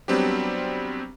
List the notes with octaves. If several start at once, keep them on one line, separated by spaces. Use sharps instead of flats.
F#3 G3 B3 C4 D4 G4